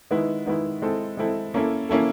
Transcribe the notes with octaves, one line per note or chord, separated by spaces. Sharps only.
D#3 G#3 B3 E4
D#3 G#3 B3 E4
G#3 C4 E4 A4
G#3 C4 E4 A4
A#3 C#4 E4 A4
A#3 C#4 E4 A4